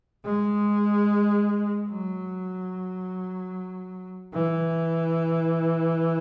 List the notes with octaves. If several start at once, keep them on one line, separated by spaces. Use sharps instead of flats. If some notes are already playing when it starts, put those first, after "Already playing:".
G#3
F#3
E3